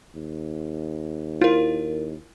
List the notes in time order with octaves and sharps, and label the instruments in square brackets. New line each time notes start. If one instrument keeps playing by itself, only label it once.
[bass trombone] D#2
[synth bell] E4 A#4 [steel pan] F4